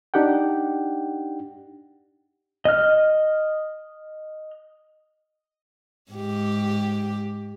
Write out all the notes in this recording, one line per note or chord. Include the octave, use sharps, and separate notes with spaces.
D4 D#4 G4 F#5 G5
D#5 F6
G#2 G4